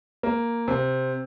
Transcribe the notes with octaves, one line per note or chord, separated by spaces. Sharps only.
A#3
C3